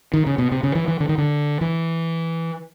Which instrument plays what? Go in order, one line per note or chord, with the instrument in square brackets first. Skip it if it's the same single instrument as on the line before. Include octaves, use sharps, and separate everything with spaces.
[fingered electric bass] D#3
C#3
B2
C3
C#3
E3
E3
D3
D#3
D3
E3